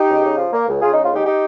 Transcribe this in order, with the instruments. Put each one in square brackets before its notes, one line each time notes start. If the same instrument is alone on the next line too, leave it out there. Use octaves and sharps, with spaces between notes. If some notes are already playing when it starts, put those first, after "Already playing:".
Already playing: [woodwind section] D#4 G4
C#2
C#3
F3
A#3
C#2
C#3 F4 G#4
G#3 D#4
F4
D#2 D#4 G4
D#4 G4